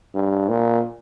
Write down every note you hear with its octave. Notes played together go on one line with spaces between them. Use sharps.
G2
A#2